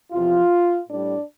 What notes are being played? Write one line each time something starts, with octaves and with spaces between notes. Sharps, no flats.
E2 C3 F3 F4
A2 G3 D4